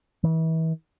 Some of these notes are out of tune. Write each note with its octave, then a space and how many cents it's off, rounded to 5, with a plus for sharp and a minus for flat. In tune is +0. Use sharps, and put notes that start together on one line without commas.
E3 -35